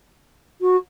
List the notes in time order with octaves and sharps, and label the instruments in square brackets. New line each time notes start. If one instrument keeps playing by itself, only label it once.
[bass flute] F#4